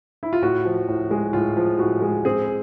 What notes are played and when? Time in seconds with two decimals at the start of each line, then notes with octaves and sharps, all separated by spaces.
0.23 E4
0.33 F4
0.42 A2 F#4
0.65 F3
0.88 A2
1.11 G#3
1.33 A2 F4
1.57 F3
1.79 A2 F#4
2.02 G#3
2.25 C4 G#4